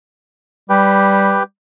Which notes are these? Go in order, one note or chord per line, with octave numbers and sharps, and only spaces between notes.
G3 G4 B4 G5